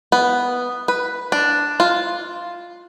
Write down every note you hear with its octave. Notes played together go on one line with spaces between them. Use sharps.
B3
B4
D4
F4